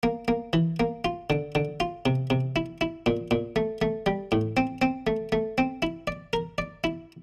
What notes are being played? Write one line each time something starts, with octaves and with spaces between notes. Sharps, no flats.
A#3
A#3
E3
A#3
F4
D3
D3
F4
C3
C3
E4
E4
A#2
A#2
A3
A3
G3
A2
C4
C4
A3
A3
C4
E4
D5
A#4
D5
E4